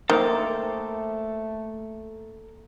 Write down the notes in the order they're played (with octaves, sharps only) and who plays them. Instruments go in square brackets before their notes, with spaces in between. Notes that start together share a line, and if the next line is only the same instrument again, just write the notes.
[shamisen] D#3 [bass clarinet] A3 [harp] A#3 C5 G5 [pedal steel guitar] A4 A#5 D6